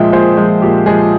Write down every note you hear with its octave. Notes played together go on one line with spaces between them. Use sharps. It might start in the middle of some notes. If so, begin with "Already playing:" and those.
Already playing: A#2 F3 G#3 E5 G5
A#2 G#4 C5
F3 G#3
A#2 G4
F3 G#3 G#4